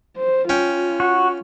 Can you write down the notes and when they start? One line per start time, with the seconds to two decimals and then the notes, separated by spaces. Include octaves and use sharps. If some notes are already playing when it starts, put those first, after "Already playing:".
0.18 C5
0.49 C#4 F4 G5
1.00 F#4